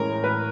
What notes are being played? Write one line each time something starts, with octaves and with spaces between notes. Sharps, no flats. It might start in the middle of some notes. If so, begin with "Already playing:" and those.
Already playing: A2 E3 G#3 C#4 A#4
B4